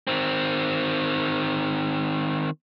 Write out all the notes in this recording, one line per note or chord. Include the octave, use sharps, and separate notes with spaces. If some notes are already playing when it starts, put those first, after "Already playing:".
D#3 C4